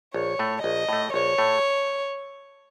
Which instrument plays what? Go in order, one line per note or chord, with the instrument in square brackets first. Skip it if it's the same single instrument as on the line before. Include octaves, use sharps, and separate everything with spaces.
[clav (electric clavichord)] A#1 [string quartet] C#5
[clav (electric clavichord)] A2 A3
[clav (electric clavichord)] A#1 [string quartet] D#5
[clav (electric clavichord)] A2 A3
[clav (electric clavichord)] A#1 [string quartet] C#5
[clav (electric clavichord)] A2 A3